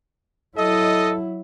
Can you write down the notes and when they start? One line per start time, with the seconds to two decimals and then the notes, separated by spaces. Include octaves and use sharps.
0.57 F#3 E4 A4 D#5